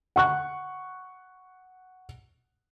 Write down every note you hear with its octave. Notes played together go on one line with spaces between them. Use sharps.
F#5 C#6 F#6